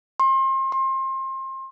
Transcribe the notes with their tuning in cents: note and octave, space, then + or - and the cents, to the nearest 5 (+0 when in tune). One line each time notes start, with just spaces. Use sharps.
C6 +35
C6 +30